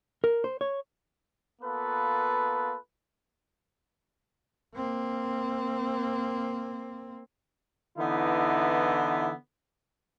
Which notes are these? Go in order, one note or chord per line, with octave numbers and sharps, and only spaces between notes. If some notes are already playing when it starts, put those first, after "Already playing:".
A#4
C5
C#5
A#3 B3 F4 A4 B4
A#3 C4
D3 E3 B3 D#4 E4